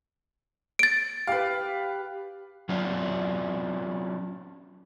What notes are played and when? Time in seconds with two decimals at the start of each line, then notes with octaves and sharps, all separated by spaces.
0.79 A6 D7
1.27 G4 B4 F5
2.69 F#3 C#4 D4 F4